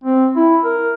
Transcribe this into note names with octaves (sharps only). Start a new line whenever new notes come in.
C4
E4
A#4